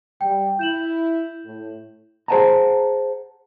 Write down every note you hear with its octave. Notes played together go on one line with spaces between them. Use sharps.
G3 G5
E4 G6 E7 F#7
A2
G#4 C5 D5 F#5 A5 A#5